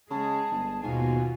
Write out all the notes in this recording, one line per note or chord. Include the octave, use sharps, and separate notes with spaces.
C#3 G#3 G#4 A5
G1
D#2 G#2 B2 F4 F#4 G#5